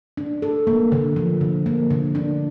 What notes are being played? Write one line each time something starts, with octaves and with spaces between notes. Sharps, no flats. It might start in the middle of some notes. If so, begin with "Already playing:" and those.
D4
A4
A#3
D3
F3
D3
A#3
D3
D4